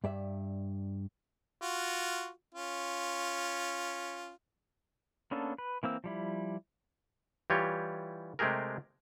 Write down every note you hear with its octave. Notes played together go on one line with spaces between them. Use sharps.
G2 D5 E5
F4 F#4
C#4 F4
A#3 B3 C#4 D4 A4
B4
E3 A#3 C4 E6
F3 G3 E4
E3 G3 F4 G4 C#5
C3 G#3 A3 G4 G#4 A#4